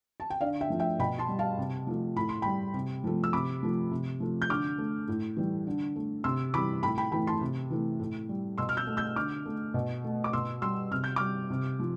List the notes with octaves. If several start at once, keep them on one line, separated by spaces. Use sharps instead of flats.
A5
G5
D3 D5 F5
E5 G5
F3 A3
E5 G5
B2 G5 B5
A5 C6
G3
F5 A5
C3
F3 A3
A2 B5
C6
G3 G5 B5
C3
F3 A3
E6
C3 B5 D6
F3 A3
C3
F3 A3
G6
D3 D6 F6
A3
A2
E3 G3
D3
A3
C3 C6 E6
E3 G3 B5 D6
A2 G5 B5
G5 B5
E3 A3 G5 B5
A5 C6
C3
E3 A3
A2
G3
B2 C6 E6
F6
E6 G6
A3
E6 G6
D3 D6 F6
A3
B2
A3
D6
B2 C6 E6
G3 C6 E6
C3 F6
G6
G3 D6 F6
C3
F3